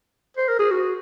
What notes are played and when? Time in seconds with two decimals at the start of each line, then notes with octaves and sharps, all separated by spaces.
0.37 C5
0.48 A#4
0.59 G#4
0.71 F#4